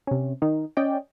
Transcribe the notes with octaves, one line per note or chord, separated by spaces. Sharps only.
C3 C#4
D#3 D#4
C#4 D5 D#5 G5